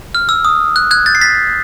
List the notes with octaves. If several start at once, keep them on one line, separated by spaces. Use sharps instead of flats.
F6
E6
D#6
F#6
F#6 G#6
G6 A6
C7
A6 B6